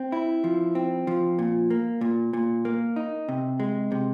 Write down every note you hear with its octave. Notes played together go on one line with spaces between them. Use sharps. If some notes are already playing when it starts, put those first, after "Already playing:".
Already playing: C4
E4
F3
C4
F3
A#2
A#3
A#2
A#2
A#3
D#4
C3
G#3
C3